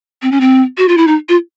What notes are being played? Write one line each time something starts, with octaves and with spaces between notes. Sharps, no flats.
C4
C#4
C4
F#4
F4
E4
D#4
F4